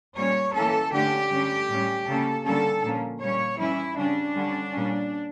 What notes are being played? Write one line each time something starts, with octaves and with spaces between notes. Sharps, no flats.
A#2 G3 A#3 C#4 C#5
E3 A#3 C#4 A4
D3 A3 C#4 G4
D3 G3 C#4
A2 G3 C#4
C#3 G3 A#3 C#4 A4
D3 G3 A#3 C#4 A4
A#2 F3 A#3 C#4
A#2 G3 C#4 C#5
E3 G3 C#4 E4
C#3 G3 C#4 D4
D3 G3 C#4
A#2 G3 C#4